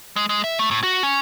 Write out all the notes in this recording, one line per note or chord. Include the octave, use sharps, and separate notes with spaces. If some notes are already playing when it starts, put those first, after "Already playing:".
G#3
G#3
E5
A3
A2
F#4
C#4